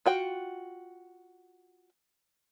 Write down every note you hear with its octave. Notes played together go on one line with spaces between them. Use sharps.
F4 F#4 G5